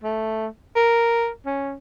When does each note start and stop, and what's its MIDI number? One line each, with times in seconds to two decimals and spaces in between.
0.03 0.47 57
0.76 1.29 70
1.46 1.74 61